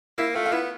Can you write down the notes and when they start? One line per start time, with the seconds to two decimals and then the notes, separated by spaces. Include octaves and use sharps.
0.18 A#3 E4
0.35 A3 F4
0.45 F4
0.52 B3 E4